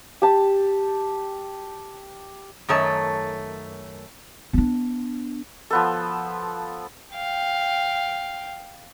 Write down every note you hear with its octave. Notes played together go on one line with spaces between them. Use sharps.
G4 A5
F#2 D#3 A3 C#5 A5
B3 D4
F3 B3 A4
F5 G5